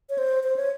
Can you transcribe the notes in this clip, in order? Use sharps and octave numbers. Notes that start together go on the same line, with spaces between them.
C#5
C5
C5
C#5